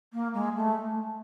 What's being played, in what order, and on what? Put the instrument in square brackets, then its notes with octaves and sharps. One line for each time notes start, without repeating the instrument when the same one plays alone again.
[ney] A#3
G#3
A3